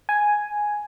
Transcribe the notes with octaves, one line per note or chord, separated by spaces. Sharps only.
G#5